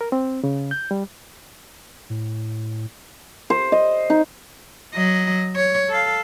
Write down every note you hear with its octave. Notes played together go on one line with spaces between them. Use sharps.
A#4
C4
C#3
G6
G3
A2
C5
D#5
D#4
F#3 D#5
C#5
A4 F5